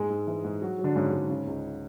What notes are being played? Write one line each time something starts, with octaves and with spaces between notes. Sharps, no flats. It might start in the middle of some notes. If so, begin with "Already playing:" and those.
Already playing: G#2 G#3 G#4
G#2
E3
G#2
F#3 F#4
F#3
D3 D4
G#2 C#3 C#4
G#2
C#3
C#2